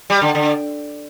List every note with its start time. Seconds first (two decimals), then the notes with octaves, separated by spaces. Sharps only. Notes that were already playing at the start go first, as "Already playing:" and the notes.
0.10 G3
0.21 D3
0.35 D3